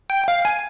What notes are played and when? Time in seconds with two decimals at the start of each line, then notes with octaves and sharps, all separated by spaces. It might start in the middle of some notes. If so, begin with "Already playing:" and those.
0.10 G5
0.28 F5
0.45 G#5